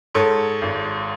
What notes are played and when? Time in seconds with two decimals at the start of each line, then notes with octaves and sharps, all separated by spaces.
0.14 G#2 A4 C#5
0.61 G#1